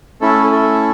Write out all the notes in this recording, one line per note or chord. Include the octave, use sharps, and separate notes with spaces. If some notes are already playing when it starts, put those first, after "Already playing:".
A3 C#4 E4 A4
A4